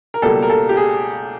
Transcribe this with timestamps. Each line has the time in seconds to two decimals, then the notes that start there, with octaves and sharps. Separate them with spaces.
0.14 A#4
0.22 C#2 B2 G3 A#3 A4
0.42 A#4
0.50 A4
0.69 G4
0.77 G#4